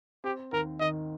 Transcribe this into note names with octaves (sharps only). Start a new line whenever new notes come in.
C4 G4
D#2 A#4
D#3 D#5